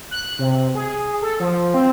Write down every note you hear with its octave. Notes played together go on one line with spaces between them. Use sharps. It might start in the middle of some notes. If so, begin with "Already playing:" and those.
F#6
C3
G#4
A4
F3
C4